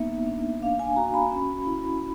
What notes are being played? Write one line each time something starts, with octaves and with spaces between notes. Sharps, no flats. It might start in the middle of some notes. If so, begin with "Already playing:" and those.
Already playing: A#3 B3 D#4 E5
D4
D4 F5
G#5
F#4 A#5
B5
C#4
E4